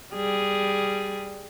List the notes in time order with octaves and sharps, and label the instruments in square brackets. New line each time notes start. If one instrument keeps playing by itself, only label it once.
[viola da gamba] G3 G#4